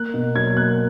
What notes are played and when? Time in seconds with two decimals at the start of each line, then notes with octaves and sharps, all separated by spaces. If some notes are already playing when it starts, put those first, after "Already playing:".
Already playing: A#3 F#6
0.14 B2
0.35 F#3 G#6
0.57 A#3 F#6